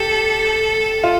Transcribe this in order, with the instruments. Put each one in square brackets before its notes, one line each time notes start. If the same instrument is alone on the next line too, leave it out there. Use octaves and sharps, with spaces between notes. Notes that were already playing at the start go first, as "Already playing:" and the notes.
Already playing: [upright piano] G4 [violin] A4
[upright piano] F4